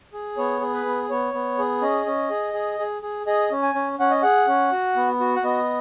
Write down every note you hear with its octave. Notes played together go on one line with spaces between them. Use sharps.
G#4
B3 C#5
G#4
B4
B3
B3 C#5
B3
G#4
C#4 D#5
C#4
G#4
G#4
G#4
G#4
G#4 D#5
C#4
G#5
C#4
C#4 F#5
D#5
G#4 F#5
C#4
F#4
B3
F#4
F#5
B3 D#5